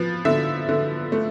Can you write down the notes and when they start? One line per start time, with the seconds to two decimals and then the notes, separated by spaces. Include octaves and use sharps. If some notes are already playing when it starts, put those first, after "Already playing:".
Already playing: F3 B4
0.25 D3 E5
0.69 D3
1.12 A3